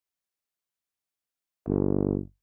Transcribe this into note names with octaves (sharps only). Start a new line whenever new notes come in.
G1